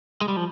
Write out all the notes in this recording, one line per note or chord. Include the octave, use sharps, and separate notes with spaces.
G#3
G3
F3